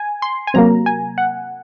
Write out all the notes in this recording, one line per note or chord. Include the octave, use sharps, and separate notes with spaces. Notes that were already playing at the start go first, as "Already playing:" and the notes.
Already playing: G#5
C6
G#5
C3 F#3 A#3 A#5
G#5
F#5